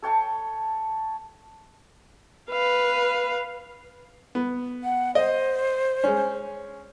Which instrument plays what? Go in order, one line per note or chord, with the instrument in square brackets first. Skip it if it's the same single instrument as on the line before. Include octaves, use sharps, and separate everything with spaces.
[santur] A4 C#5 G5 A5
[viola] B4 F5
[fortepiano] B3
[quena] F#5
[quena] C5 [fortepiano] D#5
[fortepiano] G#3 C#4